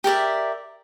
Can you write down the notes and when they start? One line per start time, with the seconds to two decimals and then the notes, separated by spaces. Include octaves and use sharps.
0.04 G4 A#4 D5 E5